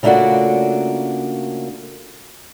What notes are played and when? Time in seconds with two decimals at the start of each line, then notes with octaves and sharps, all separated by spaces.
0.03 C#3 A3 A#3 D4 F4 F#4